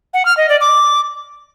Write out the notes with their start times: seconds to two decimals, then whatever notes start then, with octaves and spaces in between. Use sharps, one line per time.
0.14 F#5
0.25 F6
0.37 D#5
0.49 D5
0.61 D6